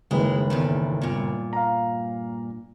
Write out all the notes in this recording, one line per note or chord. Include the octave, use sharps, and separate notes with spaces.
F#1 D#2 G#3 E4 B4
E2 A2 D#3
G2 A#2
F5 A#5